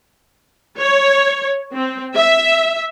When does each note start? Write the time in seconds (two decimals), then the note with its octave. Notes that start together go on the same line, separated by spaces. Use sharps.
0.79 C#5
1.74 C4
2.16 E5